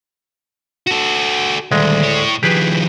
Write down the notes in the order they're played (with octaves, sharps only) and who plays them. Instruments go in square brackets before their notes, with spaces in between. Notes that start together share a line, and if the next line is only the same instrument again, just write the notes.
[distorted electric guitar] F#4 A4
[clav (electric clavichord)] D2 G#3 [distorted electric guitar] D#3 G3
[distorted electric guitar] A2 C#5
[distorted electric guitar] D#3 F3 [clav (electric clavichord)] G4 G#4 B4